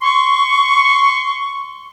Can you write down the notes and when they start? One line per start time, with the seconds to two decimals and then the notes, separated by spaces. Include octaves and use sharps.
0.02 C6 C#6